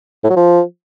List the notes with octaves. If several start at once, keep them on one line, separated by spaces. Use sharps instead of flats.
A2
F#3
F3